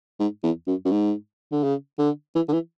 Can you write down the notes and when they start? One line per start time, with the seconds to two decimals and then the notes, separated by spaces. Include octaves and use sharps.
0.20 G#2
0.44 E2
0.67 F#2
0.85 F#2
0.91 G#2
1.52 D3
1.64 C#3
1.99 D3
2.35 E3
2.49 D3
2.53 E3